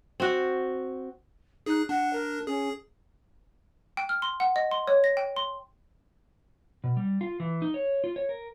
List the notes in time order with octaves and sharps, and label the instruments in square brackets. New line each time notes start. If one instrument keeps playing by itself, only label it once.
[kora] C4 F#4
[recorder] D#4 [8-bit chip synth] G#4 F#6
[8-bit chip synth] D4 [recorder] F#5
[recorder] A#4
[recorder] C#4 [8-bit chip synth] G#4
[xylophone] G5
F6
C6
F#5
D#5
C6
C#5
A#6
G5
C6
[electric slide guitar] B2
G3
F4
E3
D#4
C#5
F4
C#5
A#4